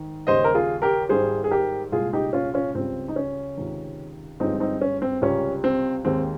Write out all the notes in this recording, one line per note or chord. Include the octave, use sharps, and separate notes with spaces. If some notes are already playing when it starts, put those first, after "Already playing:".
Already playing: G#2 D#3
D#2 C#3 G3 C5 D#5
A#4
F4 G#4
G4 A#4
G#1 G#2 G3 G#4 C5
G#4
G4 A#4
C2 A#2 G#3 F4 G#4
D#4 G4
C#4 F4
C#4 F4
C#2 C#3 G3 C4
D#4
C#4
C#2 C3 D#3
G1 G2 F3 G#3 C4 D#4
C4 D#4
C#4
C4
C#2 C3 G3 C#4
C4
D#2 D#3 G#3 C4